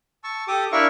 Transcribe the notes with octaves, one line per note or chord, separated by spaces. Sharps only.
A5 C#6 E6
G4 A4 D6 D#6
D4 E4 A#4 E5 F5 C#6